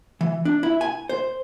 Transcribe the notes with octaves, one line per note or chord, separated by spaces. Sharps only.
E3
D4
E4
G#5
C5